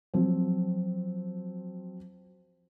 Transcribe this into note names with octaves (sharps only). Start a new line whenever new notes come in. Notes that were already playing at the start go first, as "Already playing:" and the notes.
F3 F#3 C4